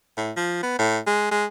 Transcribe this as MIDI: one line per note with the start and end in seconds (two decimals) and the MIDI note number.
0.17 0.32 45
0.36 0.59 53
0.63 0.75 59
0.79 0.99 45
1.07 1.30 56
1.32 1.46 56